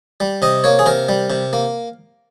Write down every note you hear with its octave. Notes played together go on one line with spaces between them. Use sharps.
G3
C3 D#5
A#3 C#5
G#4
C3 A#4
G3
C3
A#3